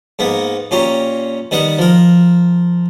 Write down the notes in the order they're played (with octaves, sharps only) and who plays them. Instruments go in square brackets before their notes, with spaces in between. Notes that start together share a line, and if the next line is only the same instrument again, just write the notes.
[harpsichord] G#2 A#3 B3
A#2 C#4 G4 A#5
D#3 G3 B3 F#5
F3 A#4